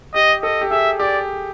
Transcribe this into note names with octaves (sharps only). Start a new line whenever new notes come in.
G4 D#5
A4 D#5
G4
G#4 E5
G4 D5